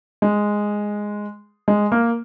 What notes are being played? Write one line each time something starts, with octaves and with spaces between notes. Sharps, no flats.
G#3
G#3
A#3